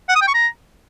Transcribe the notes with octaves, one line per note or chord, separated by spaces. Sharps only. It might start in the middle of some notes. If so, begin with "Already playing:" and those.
F#5
D#6
G5
C#6
A#5